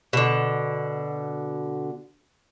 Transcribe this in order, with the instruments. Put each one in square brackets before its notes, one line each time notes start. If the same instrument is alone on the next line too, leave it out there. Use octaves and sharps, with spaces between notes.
[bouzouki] B2 D3